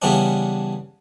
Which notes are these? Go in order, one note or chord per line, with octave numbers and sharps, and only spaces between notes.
C#3 E3 G3 B3 C#4 D4